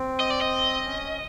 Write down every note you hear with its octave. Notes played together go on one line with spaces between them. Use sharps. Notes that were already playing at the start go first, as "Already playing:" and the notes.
Already playing: C4
D#5
D5
D#5
C#4